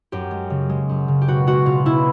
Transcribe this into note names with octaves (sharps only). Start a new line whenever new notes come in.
F#2 G4
G#3
C#3
G#3
F#2
C#3
G4
B2 F#4
G#3 F#4
B2 F4
B2 E4